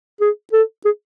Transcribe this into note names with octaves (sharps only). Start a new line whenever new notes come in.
G#4
A4
G#4